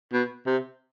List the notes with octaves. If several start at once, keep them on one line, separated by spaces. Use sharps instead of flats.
B2
C3